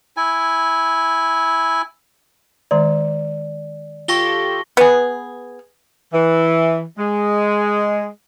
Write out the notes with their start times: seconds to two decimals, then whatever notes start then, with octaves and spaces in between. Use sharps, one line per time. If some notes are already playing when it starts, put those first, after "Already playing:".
0.17 E4 G#5
2.71 D#3 G#3 D5 A#5
4.08 F4 G4 A4 C#6 A#6 G7
4.77 B3 G#4
6.13 E3
6.98 G#3